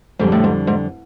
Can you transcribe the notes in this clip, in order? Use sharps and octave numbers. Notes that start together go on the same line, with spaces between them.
F2 G#2 D3 G3
A2
G#2
G#2